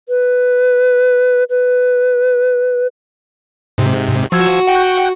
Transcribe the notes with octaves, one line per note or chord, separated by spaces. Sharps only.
B4
B4
G#2 C3
F3 F#4 E6 G#6
F#5 G5